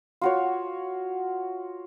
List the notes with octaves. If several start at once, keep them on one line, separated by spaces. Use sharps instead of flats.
F4 F#4 C#5